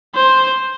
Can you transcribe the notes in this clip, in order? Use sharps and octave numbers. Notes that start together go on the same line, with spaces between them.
C5